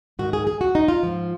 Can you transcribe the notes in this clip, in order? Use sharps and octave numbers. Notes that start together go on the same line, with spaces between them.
G#2 D#3 F#4
G#4
G#4
F#4
D#4
F4
G#2 F3